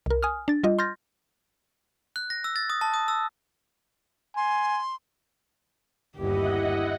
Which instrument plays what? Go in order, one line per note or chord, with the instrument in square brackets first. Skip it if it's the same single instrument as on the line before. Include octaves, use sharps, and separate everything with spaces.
[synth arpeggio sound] C2 A#4
G#5 D#6 F6
D4 A6
G3 F4 D#5
C6 F6 G6 A6 A#6
[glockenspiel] F#6
A#6
E6
A6
D#6
A5
D#6
E6
[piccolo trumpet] G#5 [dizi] C6
[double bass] G1 D#2 [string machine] E4 D#5 F#5 [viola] G4